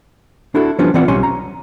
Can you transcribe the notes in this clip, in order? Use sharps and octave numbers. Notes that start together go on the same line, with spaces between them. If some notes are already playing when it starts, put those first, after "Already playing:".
D4 E4 F#4 A4
F3 G3 B3 C#4 D4 F4
E3 B3 C4 F4 D5 F#5
B1 G3 C#4 C#5 G#5 C6
A#5